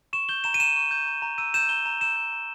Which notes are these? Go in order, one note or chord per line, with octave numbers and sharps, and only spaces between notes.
C#6 E7
G6 G7
A#5 E7
D#7
A#5 E7
C#6
G6
A#5
A#5
E6 D#7
G6 E7
A#5 G7
A#5
E6 E7
G6
A#5